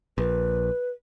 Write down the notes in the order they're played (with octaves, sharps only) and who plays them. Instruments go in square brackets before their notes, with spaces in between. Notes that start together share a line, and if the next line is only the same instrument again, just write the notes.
[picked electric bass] A#1 [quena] B4